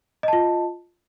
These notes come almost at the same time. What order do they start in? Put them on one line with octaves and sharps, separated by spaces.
D#5 A5 F4